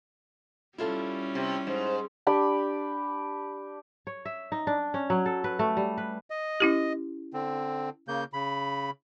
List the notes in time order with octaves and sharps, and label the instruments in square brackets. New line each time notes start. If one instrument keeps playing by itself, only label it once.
[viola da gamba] G3 C#4 [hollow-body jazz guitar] E4 F4 A4
[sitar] C3
[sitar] G#2 [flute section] C5
[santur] D4 G4 B5
[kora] C#5
E5
D#4
D4
C#4
F#3
A4
B4
A3
G3
B4
[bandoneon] D#5
[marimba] C#4 E4 G4
[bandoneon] D3 C4
C#3 A#3 G6
C#3 B5